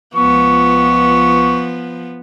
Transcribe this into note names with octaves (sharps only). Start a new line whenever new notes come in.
C#2 F3 B3 C#6